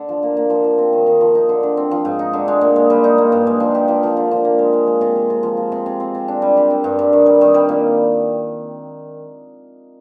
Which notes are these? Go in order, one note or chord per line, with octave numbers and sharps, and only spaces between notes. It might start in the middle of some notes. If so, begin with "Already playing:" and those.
Already playing: D3
F3
A#3
A#3
F3
F3
C4
D#3
D#3
F3
D#4
D3
D3
C4
F3
G#2
D#4
D3
G#3
A#2
G#3
G3
D#4
A#3
G2
G#3
F3
G4
F3
F3
D3
F3
A#3
G#3
G#3
G#3
C3
C3
C3
F3
F3
C3
C3
C4
C3
D4
G3
G4
C4
G2
G2
D#3
G3
D#3
G3
A#2